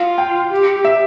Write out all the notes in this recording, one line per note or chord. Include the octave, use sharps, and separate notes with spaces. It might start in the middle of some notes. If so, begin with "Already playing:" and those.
Already playing: F4 F5
G5
G4
E5